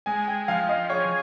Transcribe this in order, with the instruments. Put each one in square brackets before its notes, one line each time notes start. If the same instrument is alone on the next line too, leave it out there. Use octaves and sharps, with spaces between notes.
[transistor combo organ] G#3 [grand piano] G#5
[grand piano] G5
[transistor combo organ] F3 [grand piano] F5
[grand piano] D#5
[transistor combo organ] G#4 [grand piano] C#5